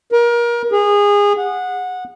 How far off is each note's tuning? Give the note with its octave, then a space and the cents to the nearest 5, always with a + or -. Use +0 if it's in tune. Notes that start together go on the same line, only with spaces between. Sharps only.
A#4 +30
G#4 -25
F#5 -15